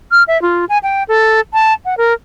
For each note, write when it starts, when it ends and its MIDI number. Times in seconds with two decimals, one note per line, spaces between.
0.11 0.23 89
0.28 0.40 76
0.42 0.65 65
0.69 0.78 80
0.83 1.03 79
1.08 1.40 69
1.53 1.73 81
1.85 1.94 78
1.97 2.13 70